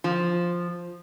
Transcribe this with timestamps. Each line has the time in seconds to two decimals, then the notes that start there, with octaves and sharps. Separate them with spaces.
0.04 F3